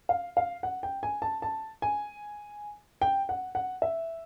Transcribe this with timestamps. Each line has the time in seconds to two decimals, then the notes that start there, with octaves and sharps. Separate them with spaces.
0.09 F5
0.37 F5
0.63 F#5
0.83 G5
1.03 G#5
1.22 A5
1.42 A5
1.82 G#5
3.01 G5
3.29 F#5
3.55 F#5
3.82 E5